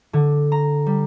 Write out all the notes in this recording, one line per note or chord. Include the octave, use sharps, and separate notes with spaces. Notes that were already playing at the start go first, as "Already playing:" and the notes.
D3
A#5
G3